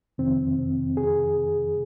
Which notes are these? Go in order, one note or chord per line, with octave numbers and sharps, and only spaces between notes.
F2 C3 D#3 C4
G#4